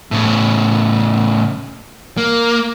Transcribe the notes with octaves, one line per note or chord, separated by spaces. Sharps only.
A2 C#3
A#3